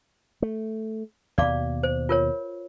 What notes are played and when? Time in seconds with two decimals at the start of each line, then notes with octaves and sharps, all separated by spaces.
0.42 A3
1.38 D#2 B2 D5 F5 D6
1.83 C5
2.09 F4 A#4 C#5